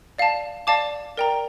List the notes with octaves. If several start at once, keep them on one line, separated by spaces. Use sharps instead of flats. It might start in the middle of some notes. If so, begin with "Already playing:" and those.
D5 F5 A5
D5 F5 A5 D6
A#4 D5 G5 A#5